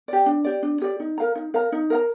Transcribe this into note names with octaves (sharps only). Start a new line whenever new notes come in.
G4 D5
D4
G4 D5
D4
G4 D5
D#4
A#4 F5 A#5
D#4
A#4 F5 A#5
D#4
A#4 F5 A#5